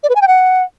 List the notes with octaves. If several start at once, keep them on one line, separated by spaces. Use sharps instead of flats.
D5
B4
G#5
G5
F#5